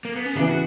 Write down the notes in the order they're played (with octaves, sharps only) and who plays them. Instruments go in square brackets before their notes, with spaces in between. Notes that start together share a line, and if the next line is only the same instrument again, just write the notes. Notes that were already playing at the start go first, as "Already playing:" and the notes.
[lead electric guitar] A#3
B3
C#4
[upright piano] C#3 E3 B3 [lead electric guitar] D4
[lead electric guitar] F#4